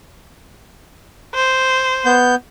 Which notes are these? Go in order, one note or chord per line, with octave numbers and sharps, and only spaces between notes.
C5
B3 G6